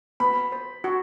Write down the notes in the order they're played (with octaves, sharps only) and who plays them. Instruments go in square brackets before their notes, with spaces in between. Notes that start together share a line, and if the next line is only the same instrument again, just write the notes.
[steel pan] B3 [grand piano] B5
[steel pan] C5
F#4